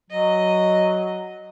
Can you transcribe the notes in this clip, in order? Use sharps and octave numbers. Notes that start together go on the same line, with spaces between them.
F#3 D#5